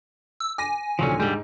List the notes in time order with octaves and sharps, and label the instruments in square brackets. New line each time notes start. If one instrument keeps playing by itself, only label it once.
[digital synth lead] E6
[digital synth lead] G#5 [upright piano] D6 A#6
[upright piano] D#2 A#2 D3 [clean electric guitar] F3 F#3 C#4
[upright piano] G#2 [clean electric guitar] D3 G3